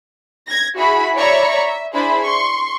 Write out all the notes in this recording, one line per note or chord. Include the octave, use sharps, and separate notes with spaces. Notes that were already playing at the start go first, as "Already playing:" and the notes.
G#6 A#6
E4 F#4 G#4 B5
C#5 D5 E5 A#5 B5 C#6
E5
D4 E4 G#4 C5 B5
C6 C#6